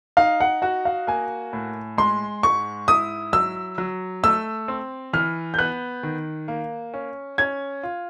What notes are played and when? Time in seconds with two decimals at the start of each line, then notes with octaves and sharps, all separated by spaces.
0.17 D#4 F5
0.40 F#5
0.62 F#4 F#5
0.85 F5
1.07 A#3 G#5
1.53 A2
1.98 G#3 C6
2.43 G#2 C#6
2.88 E4 D#6
3.33 F#3 E6
3.78 F#3
4.23 A3 E6
4.68 C4
5.13 E3 F6
5.54 G6
5.58 B3 F#6
6.03 D#3
6.48 A#3
6.94 C#4
7.38 C#4 G#6
7.83 F4